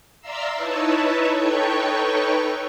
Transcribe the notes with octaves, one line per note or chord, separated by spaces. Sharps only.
D5 E5 F5 A#5 C6 E6
D#4 E4 B4 C#5 E5 A5
D#4 A4 B4 C#5 G5 C#6